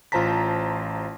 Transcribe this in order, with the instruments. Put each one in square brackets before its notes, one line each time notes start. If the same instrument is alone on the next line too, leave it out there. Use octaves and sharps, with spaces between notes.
[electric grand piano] A1 F4 C5 A5 A#5 B6